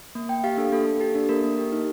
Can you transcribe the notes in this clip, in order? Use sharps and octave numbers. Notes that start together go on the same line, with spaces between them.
A#3
A#3 G5
G4 F5
D4 A4
A#3 A4
A#3
G4 A4
D4
A#3 A#4
A#3
G4
D#4